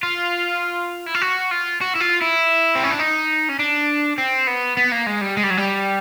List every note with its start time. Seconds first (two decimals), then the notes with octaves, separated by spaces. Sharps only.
0.03 F4
1.06 E4
1.15 F4
1.22 F#4
1.51 F4
1.81 F#4
1.95 E4
2.00 F4
2.21 E4
2.76 C4
2.84 C#4
2.91 D4
3.00 D#4
3.49 C#4
3.59 D4
4.18 C4
4.47 B3
4.77 B3
4.92 A#3
5.06 G#3
5.21 G3
5.37 G#3
5.44 G3
5.50 F#3
5.57 G3